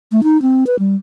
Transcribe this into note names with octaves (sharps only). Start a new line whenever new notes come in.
A3
D#4
C4
B4
G3